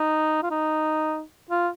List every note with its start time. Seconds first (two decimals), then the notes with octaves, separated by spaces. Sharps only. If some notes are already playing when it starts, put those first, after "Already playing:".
Already playing: D#4
0.43 F4
0.51 D#4
1.50 F4